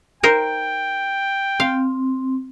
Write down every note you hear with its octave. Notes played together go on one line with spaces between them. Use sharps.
D#4 A#4 C5 G5
C4 F5